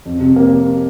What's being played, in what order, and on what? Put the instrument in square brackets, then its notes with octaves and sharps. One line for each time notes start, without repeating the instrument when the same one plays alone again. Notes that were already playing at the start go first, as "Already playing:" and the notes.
[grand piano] F2
C3
A#3